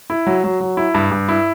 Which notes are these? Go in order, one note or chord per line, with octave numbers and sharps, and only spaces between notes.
E4
F#3
F#3
F#3
E4
G2
G2
E4